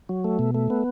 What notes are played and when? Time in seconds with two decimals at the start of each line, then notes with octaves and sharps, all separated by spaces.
0.09 F#3
0.24 A3
0.39 B2
0.55 A3
0.70 B3